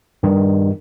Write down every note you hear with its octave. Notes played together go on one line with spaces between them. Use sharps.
G2 D#3